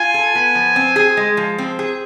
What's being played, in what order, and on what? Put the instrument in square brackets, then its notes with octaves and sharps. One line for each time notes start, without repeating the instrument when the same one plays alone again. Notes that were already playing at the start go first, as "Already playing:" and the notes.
Already playing: [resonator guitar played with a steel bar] F4 [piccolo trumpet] G#5
[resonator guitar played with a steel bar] A4
B3
F3
C4
G#4
G#3
F3
C4
G#4